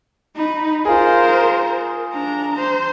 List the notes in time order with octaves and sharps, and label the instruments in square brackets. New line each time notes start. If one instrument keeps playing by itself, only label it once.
[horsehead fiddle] D#4 B5
[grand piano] F4 G#4 [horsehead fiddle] A#4 C5
[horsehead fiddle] D4 A#5
C5